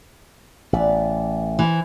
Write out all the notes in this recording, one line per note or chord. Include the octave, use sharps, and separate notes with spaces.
A1 B3 D5
E3 F3 E5